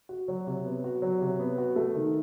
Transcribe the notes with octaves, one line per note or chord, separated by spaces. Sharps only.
F#4
F#3
C3
B3
F#4
F#3
C3
B3
F#4
A3
D#3